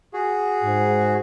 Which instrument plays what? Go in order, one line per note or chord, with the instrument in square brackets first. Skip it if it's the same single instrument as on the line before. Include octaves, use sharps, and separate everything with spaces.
[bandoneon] F#4 G#4
[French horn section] G#2